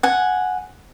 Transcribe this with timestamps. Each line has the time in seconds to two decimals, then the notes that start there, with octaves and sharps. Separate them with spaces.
0.03 F#5 G#5